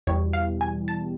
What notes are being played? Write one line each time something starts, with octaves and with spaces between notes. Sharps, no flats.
E2 B2 G3 C#5
F5
G#5
A5